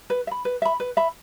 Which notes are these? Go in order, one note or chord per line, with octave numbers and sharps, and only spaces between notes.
B4
E5
B5
B4
E5 B5
B4
E5 B5